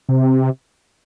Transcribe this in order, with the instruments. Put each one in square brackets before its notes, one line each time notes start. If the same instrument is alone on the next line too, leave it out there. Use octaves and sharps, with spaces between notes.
[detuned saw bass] C3